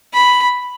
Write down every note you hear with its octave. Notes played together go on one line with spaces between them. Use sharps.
B5